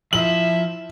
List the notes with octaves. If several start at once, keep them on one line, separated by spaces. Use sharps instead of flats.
F3 E4 E5 F#7